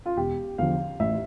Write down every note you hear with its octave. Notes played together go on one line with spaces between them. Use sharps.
F4
E1 G4
E2 D3 F3 F5
A1 E5